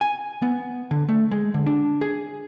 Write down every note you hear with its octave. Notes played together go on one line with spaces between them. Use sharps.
G#5
B3
D3
A3
G#3
D3
D4
G#4